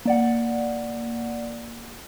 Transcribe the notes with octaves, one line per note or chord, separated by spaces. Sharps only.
A#3 D5 F#5